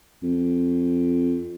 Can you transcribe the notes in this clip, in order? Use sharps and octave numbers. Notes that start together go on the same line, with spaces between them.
F2